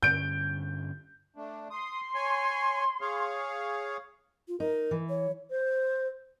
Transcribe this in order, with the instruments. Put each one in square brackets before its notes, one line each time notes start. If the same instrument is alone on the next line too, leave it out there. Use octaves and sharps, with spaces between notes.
[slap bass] G2 D3 C#4 [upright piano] G6 D7
[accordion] A3 D4
[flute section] C6 [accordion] D#6
[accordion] C#5 G#5
G#4 C#5 F5
[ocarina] F4
[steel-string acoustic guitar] D#4 [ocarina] A#4
[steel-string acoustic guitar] E3
[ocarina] C#5
[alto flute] C5